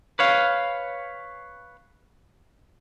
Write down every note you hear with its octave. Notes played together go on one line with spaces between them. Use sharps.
B4 C#5 F5